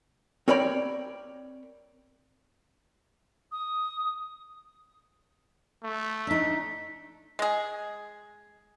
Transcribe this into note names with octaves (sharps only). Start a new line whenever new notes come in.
C4 A#4 C#5 D5 G5 B5
D#6
A3
D4 D#4 B6
G#3 G#4